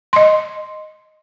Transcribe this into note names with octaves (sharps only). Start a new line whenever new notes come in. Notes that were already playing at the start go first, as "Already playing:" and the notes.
D#5 C6